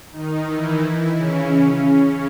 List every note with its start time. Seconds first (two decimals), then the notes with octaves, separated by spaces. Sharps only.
0.11 D#3 D#4
0.45 E3 E4
1.15 C#3 C#4
1.49 C#3 C#4